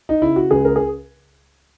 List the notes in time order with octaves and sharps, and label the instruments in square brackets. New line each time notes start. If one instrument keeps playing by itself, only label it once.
[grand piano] D#4
C#3 E4
F#4
C#2 G#4
A#4
G#4